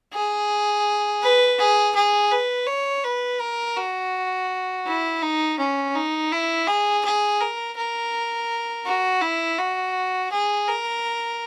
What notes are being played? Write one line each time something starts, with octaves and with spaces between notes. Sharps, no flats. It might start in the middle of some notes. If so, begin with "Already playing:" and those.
G#4
B4
G#4
G#4
B4
C#5
B4
A#4
F#4
E4
D#4
C#4
D#4
E4
G#4
G#4
A#4
A#4
F#4
E4
F#4
G#4
A#4